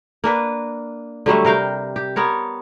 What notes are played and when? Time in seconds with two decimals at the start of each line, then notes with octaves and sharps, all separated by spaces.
0.24 A#3 D4 B4
1.26 D3 F#3 G3 A3
1.45 C3 A#4 F5 G5
1.96 G4
2.16 B3 A#4 C#5